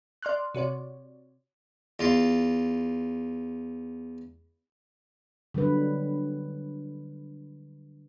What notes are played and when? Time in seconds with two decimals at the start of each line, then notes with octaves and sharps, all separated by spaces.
0.23 D5 C6 F6 F#6
0.55 C3 F#4 C#5 D5
1.99 E2 F4 C6
5.54 D3 F#3 G3 B4